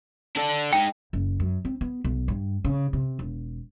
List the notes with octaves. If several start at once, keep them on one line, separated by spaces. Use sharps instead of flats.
D4 A4
G#3 D#4 G5
F#1
F#2
C4
B3
B1
G2
C#3
C3
E1